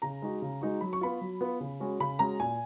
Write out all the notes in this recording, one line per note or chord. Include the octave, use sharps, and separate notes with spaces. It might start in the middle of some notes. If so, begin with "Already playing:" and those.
C#3 A#5
G#3 D#4 F#4
C#3
G#3 D#4 F#4
F#3 B5
C#6
B3 F4 B5
F#3
B3 F4
C#3
G#3 C#4 F#4
C#3 B5
G#3 C#4 F#4 A#5
A#2 G#5